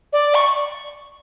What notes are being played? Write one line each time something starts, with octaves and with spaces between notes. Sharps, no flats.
D5
C#6